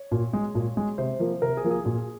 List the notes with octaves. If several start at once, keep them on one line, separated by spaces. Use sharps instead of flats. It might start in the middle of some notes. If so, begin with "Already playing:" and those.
Already playing: C#5
A#2
G#3
A#2
G#3
C3 C5
F3 A#3
C3 A#4
G#4
F3 A#3
G#4
A#2 G#4